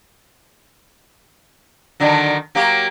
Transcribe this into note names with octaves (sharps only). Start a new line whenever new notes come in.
D3 D#3 F#3
F#3 A#3 G4